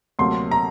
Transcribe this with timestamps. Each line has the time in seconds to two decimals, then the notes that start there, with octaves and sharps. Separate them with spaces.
0.19 D2 C3 F#3 A#3 C6
0.51 A#5